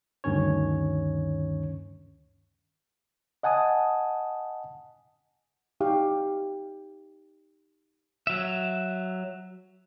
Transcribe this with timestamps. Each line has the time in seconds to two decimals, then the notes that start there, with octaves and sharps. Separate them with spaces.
0.24 D2 G2 D#3 C#4 C#5
3.43 D#5 F#5 G#5 A5 D#6
5.80 D#4 G4 F5
8.27 F#3 E5